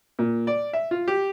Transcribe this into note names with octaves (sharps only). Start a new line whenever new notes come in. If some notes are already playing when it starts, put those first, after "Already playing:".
A#2
D5
E5
F4
G4